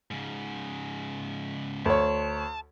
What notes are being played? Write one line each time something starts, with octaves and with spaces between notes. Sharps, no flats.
G#2 C#3
D2 C#5 A5